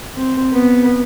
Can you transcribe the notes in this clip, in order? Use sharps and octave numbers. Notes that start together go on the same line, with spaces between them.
C4
B3